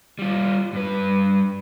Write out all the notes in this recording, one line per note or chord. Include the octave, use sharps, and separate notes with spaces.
G3 F4
G2 B4